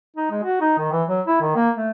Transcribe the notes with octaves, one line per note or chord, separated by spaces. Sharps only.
D#4
G#3
F#4
D#4
D#3
E3
F#3
E4
D#3
A#3
A3